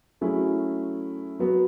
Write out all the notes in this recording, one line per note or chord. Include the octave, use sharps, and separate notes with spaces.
F#3 A3 C#4 E4 G#4
F#3 B3 F#4